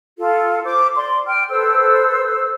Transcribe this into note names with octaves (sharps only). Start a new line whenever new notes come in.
F4 A4
C5 D6
D5 C6
G5 F6
A4 B4 C5 E6